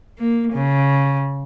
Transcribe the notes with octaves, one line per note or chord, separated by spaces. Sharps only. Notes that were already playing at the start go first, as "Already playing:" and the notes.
A#3
C#3